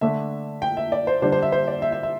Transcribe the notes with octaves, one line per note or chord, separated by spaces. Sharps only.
D3 A3 D4 E5
G5
E5
D5
C5
D3 G3 D4 C5
C5
E5
C5
D5
E5
E5
E5